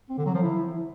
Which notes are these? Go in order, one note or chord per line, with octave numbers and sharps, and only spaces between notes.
C4
D3
F#3
F3
E4